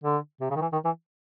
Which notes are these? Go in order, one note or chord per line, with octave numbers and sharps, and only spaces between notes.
D3
C3
C#3
D#3
E3
D#3
E3